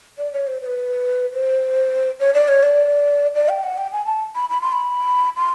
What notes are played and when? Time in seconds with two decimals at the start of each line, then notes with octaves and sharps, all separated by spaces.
0.18 D5
0.33 C#5
0.47 C5
0.61 C5
0.66 B4
1.33 C5
2.20 C#5
2.34 D5
2.48 C#5
2.62 D5
3.34 D5
3.49 G5
3.63 F#5
3.77 G5
3.92 G#5
4.06 A5
4.35 B5
4.49 B5
4.61 C6
4.72 B5
5.36 C6